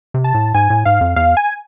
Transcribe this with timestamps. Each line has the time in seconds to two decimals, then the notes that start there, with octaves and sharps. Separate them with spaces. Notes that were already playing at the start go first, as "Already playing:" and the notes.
0.14 C3
0.24 A5
0.34 A2
0.54 G#2 G#5
0.70 A2
0.85 G#2 F5
1.01 F2
1.16 E2 F5
1.37 G#5